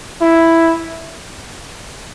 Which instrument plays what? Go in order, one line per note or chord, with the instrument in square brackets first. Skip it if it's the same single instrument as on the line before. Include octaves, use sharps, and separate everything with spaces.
[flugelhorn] E4